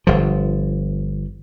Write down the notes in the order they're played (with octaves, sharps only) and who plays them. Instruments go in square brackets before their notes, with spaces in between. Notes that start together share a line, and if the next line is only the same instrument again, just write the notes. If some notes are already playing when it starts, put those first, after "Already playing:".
[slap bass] G1 F3